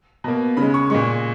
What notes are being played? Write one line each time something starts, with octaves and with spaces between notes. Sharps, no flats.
B2 A#3
C#3 G#3 B5
C#6
A#2 G#3 C#6